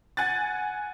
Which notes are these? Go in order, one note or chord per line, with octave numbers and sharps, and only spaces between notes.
F#5 G#5 F#6 A6